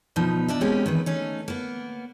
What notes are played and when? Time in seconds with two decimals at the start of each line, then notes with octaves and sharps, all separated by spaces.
0.16 D2 B2 F3 D#4 B4
0.48 E2 D4 D#5 E5
0.61 B2 D#3 G#3 C4 C#4 G4
0.86 D#3 E3 B4
1.06 A3 C#4 D#4
1.48 A#3 B3